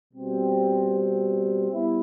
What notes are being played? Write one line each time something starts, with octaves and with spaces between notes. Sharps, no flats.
B2 G3 C4
G3 B3 E4